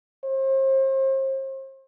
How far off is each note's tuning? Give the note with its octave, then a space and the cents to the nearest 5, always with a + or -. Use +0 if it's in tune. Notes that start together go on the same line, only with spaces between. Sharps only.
C5 +35